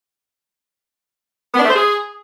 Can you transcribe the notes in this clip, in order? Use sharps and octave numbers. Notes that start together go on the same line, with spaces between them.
B3
D4
A3
C5
G#4